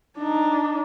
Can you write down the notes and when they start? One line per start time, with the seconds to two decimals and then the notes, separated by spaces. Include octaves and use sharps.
0.17 D4 D#4